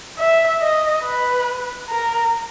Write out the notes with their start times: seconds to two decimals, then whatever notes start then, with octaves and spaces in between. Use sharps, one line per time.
0.18 E5
0.61 D#5
1.03 B4
1.90 A#4